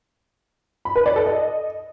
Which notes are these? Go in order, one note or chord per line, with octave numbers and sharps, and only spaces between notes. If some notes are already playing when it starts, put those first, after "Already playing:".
B5
B4
D5
A4
D#5